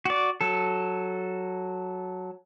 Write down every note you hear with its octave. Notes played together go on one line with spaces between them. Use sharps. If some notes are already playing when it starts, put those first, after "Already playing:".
F#4 D5
F#3 A4